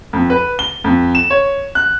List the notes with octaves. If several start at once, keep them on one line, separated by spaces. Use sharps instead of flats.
F2
B4
G7
F2
E7
C#5
F#6